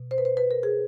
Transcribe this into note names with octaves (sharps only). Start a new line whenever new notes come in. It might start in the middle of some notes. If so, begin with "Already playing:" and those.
Already playing: B2
C5
B4
C5
B4
A#4
G#4